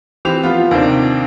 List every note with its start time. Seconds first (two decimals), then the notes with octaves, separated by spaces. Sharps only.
0.25 E3 C4 G4 F7
0.43 F3 B3 F4
0.71 D#2 C3 D#3 C4 D4